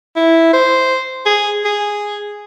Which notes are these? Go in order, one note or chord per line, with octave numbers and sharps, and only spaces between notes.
E4
C5
G#4
G#4